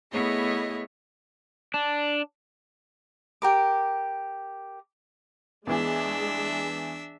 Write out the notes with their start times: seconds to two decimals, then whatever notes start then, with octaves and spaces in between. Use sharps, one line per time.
0.11 A3 B3 E4 G#4 C#5 D#5
1.74 D4
3.42 G4 A#4 D6
5.67 E2 E3 G#3 D4 E5